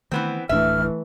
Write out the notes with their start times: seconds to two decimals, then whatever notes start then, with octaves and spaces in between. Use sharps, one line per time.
0.11 D#3 E3 A3 B3 C4
0.49 D1 A2 E3 A3 D4 E5 F6